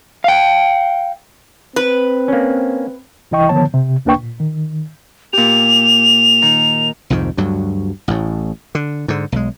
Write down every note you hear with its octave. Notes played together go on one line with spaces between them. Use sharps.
F5 G5
C4 B4
A#3 C#4
C2 E3 E4 D#5 G5 C#6
D3 D#3 F3 B3 C#5 A5
C3
D2 A#3 D4 B4 G5 C#6
A#2
D#3
A#2 G4 F7
D#3
C2 F2 G#2 D#3
D2 G2 F#3
A1 A2
D3
G#2 D3
B1 G#3